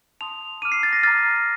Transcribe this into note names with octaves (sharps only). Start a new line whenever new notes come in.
A5 C6 D#6 F7
A#5 D6 F6 D#7
C7
A6
A#6
A#5 D6 F6 A6